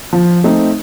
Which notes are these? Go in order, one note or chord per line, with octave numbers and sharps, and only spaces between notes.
F3
A3 C4 D#4